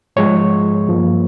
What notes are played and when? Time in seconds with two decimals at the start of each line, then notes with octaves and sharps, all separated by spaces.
0.16 G#2 F3 G#3 C#5
0.88 G2 F3 A#3